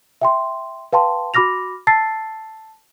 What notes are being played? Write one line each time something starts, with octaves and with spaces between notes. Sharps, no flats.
E5 G5 C6
B4 F5 G5 A5 C6
F#4 B5 D6 F6 A#6 F7
A5 E6 A6 C7